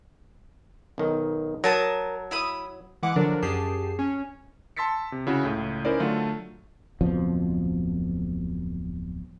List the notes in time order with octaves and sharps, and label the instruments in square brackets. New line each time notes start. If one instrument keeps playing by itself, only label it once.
[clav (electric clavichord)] B1 D#3
[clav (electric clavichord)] F#3 [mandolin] A#4 A5 D#6
[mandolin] E4 B5 D#6
[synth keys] E3 G#3 F#5 D6
D3 F3 F#3 D4 A#4
F#2 G4 G#4 A5 C7
C#4
[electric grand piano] A5 C6 E6 A6 B6 C#7
C3
C#3 E4 F#4
C#2 A2
C#4 D#4 E4 A#4 C5 D5
D3 F#3 A3 F4 A4
[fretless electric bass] D1 F2 B2 F3